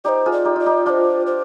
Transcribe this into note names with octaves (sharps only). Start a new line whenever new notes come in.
D#4 G4 C5 D5
F4 G#4
D5
D#4 G4
F4 D5
D#4 G4
D4 F4 C5 D5
C5